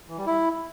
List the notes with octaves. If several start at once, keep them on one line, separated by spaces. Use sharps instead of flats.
E3
G3
E4